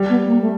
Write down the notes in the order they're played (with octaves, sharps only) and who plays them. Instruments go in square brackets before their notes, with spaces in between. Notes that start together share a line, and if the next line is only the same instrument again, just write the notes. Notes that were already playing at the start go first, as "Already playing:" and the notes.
Already playing: [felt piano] G3
[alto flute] B3
A#3
A3